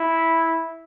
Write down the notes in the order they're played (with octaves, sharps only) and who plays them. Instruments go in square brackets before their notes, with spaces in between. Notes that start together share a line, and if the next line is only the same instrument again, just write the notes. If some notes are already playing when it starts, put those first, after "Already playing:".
Already playing: [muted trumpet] E4